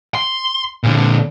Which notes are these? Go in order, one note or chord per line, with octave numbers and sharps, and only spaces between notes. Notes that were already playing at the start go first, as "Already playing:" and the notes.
C6
A#2 D3